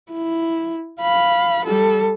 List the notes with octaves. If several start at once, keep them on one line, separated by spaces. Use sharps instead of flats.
E4
F5 B5
G3 A4